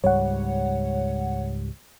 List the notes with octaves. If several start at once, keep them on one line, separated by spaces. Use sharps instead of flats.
C#2 G#2 G3 C#5 F#5